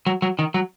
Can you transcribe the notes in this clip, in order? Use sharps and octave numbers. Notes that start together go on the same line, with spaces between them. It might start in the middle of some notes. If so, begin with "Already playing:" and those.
F#3
F#3
D#3
F#3